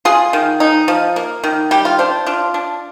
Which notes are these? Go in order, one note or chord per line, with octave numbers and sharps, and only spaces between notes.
F4 G#4
D#3
D#4
F3
A#3
D#3
G3 G4
F4
D4 C5
D4 F4
D4